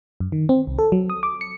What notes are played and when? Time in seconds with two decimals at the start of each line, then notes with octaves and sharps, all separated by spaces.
0.20 F#2
0.32 D#3
0.49 C4
0.67 C2
0.79 A4
0.92 F#3
1.10 D#6
1.23 D6
1.41 C#7